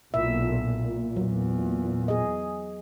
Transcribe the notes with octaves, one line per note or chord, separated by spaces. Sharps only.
B1 A#2 E5
E2 F#3
G#4 D#5